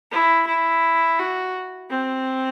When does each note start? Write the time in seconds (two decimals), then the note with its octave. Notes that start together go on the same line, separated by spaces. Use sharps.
0.11 E4
0.47 E4
1.19 F#4
1.90 C4